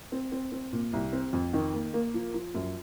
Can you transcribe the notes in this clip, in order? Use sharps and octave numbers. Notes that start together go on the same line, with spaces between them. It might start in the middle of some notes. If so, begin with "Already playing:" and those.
C4
C4
C4
A#2
C2
C4
F2
D#3
A#3
A#3
F3
F3
F#2